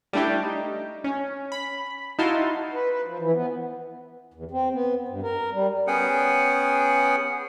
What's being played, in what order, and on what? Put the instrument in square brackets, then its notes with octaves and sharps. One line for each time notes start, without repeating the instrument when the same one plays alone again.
[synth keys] G3 A3 D4 E4 G4
D#4
C#4
B5
D#4 E4 F#4 F5 A5 C6
[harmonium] B4
B4
F3
E3
B3
E2
C4
B3
G2
A#4
G3
[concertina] B3 C#4 G#4 F#5 G5